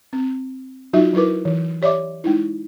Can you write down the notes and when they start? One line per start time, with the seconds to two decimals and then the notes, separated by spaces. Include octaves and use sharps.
0.13 C4
0.93 F#3 D#4 F4 F#4 E5
1.14 F#3 E4 A#4 B4 D6
1.45 E3
1.82 G4 C#5 D5 E5 D6
2.24 G#3 D#4 E4